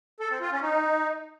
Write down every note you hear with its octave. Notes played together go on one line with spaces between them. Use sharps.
A4
C4
F4
C#4
D#4